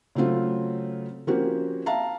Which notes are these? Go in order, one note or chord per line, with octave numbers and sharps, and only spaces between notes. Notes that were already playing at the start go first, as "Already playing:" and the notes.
C#3 F#3 A3 C4 F4
F3 A#3 C4 C#4 F#4 G4
E5 F5 A5 A#5